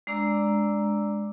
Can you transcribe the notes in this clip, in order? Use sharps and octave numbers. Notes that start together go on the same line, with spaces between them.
G#3 D4 D5 A#5 D6 E6